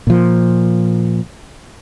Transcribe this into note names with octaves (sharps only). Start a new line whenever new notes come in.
A#2 F3